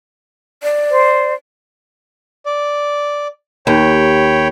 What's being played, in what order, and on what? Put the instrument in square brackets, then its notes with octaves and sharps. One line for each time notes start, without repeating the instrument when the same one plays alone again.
[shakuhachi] D5
[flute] C5
[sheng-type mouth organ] D5
[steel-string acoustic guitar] D#2 [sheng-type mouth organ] C#5 G5 B5